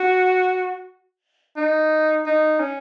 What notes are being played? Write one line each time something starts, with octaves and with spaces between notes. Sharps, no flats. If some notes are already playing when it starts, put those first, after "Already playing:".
Already playing: F#4
D#4
D#4
C#4